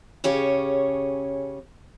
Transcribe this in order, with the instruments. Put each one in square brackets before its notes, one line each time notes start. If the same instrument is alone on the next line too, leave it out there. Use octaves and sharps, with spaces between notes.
[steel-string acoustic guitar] C#3 C#4 G4 G#4 C#5